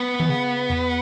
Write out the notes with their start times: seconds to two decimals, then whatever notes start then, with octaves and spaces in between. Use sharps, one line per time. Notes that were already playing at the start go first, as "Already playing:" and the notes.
Already playing: B3
0.20 E3
0.29 C#3
0.70 E2